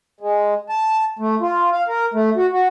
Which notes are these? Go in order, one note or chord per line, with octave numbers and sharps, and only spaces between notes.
G#3
A5
A3
F4
F5
A#4
A3
F#4
F#4